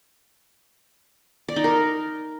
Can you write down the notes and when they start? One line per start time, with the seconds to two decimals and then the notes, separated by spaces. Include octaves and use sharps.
1.48 D5
1.56 D#4
1.64 A#4